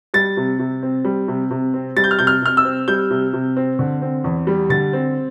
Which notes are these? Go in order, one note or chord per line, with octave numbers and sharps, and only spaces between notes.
G3 A6
C3
C3
C4
G3
C3
C3
C4
G3 A6
G6
F6
C3 G6
F6
C3 F6
E6
C4
G3 G6
C3
C3
C4
D3
C4
E2
G3
D3 A6
C4